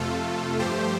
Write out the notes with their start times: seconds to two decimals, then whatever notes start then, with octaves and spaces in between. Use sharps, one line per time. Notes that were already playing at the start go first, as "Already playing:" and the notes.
Already playing: F2 C3 A3 F4 A4
0.59 G2 F3 A3 G4 C5